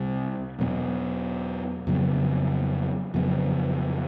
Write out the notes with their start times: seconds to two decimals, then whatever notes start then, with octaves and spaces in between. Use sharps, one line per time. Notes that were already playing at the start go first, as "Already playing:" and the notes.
Already playing: C2 C3 G3
0.59 E2 B2 F#3 B3
1.87 F2 C#3 F#3 B3
3.14 F2 C#3 F#3 B3